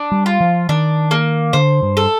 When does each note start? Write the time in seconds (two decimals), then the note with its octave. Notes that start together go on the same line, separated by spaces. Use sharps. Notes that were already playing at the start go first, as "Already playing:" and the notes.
Already playing: D4
0.12 G3
0.26 F4
0.41 F3
0.69 D#3 D4
1.11 A#3
1.53 D3 C5
1.82 G2
1.97 A4